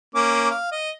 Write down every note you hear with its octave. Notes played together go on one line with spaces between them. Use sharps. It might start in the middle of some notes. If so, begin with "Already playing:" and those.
A#3 C#4 D6
F5
D#5